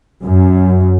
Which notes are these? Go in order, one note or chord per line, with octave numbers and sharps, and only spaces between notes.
F#2